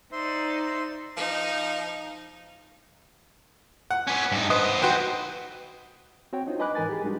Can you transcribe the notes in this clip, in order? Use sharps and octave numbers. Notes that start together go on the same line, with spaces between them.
D#4 C5 D5 E5 C6
F3 D#4
F#5
C#4 B4
G2 D#4
B3 B4 C5 D#5
D#2 F#4 B4 C5 G5
C4 F#4 C#5 G5
D4 D#4 F4 C5
B4 D#5 G#5 B5 D6 F#6
G#2 E3 A#4 G#5 A6
G4 G#4
G3 G#3 D4 D#4 F#4 G4